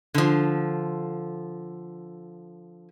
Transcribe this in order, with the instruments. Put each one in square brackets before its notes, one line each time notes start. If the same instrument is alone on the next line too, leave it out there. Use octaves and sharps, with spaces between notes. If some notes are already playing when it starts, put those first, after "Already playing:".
[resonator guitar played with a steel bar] D3 F3